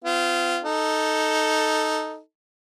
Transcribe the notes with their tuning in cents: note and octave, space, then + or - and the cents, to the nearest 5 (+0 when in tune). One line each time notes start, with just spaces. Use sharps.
C4 -40 F4 -15
D#4 +0 A4 +0